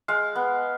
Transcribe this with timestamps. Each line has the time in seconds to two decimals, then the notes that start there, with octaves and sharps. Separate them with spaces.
0.08 G#3 F5
0.35 B3